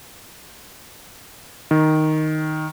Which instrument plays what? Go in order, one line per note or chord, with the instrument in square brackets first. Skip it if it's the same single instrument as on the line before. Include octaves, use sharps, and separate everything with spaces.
[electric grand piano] D#3